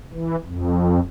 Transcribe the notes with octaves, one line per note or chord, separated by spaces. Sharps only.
E3
F2